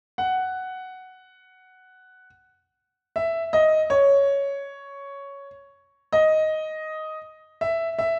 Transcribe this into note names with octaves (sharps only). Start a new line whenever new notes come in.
F#5
E5
D#5
C#5
D#5
E5
E5